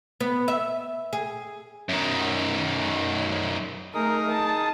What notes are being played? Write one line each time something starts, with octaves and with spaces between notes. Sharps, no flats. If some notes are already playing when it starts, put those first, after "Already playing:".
B3
E5
G#4
F#2 D#3
A3 D#4 G#4 A#4 D#6
A5